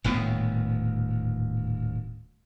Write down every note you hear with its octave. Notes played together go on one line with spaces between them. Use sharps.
D#1 D2 A2 B3